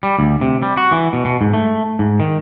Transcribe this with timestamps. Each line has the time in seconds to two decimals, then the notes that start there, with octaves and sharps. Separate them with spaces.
0.03 G3
0.19 D2
0.41 C3
0.62 G3
0.77 F#4
0.92 E3
1.13 B2
1.25 B2
1.41 G#2
1.53 A3
1.99 G#2
2.20 D#3